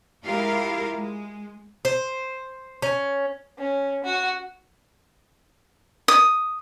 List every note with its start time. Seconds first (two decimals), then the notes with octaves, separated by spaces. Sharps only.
0.24 G#3 E4 F4 G4 A#4 F5
0.98 G#3
1.85 C5
2.82 C#4
3.58 C#4
4.04 F#4
6.08 D#6